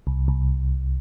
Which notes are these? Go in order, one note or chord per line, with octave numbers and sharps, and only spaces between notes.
C2
C2